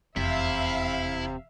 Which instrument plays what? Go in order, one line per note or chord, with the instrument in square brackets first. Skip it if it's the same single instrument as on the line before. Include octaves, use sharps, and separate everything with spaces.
[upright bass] F1 E2 [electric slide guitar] C3 [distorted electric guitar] E4 [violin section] E5 F5